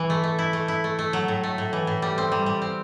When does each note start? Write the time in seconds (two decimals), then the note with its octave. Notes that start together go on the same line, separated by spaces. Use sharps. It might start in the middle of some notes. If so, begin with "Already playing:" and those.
Already playing: E3
0.10 A3
0.24 A3
0.39 E4
0.53 A3
0.68 E4
0.84 A3
0.99 A3
1.13 F#3
1.28 A2
1.43 A3
1.58 A2
1.73 E3
1.87 A2
2.02 G3
2.18 C4
2.32 G3
2.46 G3
2.62 C4